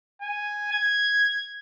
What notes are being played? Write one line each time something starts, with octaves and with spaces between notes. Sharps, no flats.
G#5
G#6